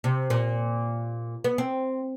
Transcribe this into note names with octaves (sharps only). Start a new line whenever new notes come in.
C3
A#2
B3
C4